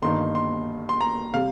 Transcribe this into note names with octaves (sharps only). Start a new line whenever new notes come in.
G1 G2 D#3 A#3 D#4 C6
C6
C6
A#5
C3 G3 F5